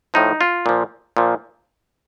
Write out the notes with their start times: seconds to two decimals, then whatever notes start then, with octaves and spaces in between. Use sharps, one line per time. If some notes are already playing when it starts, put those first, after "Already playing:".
0.14 A2 F3 D#4
0.41 F4
0.66 A#2 F3
1.17 A#2 F3